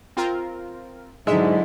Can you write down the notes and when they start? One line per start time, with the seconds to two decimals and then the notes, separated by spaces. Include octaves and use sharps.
0.17 C4 F4 A#4
1.27 G#2 D3 F#3 G#3 E4 E5